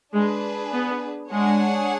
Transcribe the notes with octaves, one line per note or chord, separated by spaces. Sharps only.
G#3 D4 G#4 B4
B3
G#3 D4 G#4 C#5 F#5